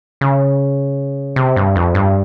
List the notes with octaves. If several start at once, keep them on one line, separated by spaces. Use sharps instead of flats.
C#3
C3
G2
F2
G2